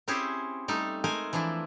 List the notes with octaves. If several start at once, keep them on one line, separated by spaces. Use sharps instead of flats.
C4 C#4 E4 G4 G#4 C5
G3 A3 D#4
G#3 A3 A#4 C5 G#5
E3 F3 D4 E4